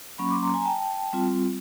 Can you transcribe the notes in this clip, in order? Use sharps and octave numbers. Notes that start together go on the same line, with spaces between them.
F#3 A#3 C#4 B5 C#6
C6 D6
A#5 C6
G#5 A#5
G5 A5
G3 C4 F4